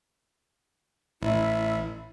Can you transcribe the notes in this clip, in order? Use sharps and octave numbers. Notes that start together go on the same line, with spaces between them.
A1 E4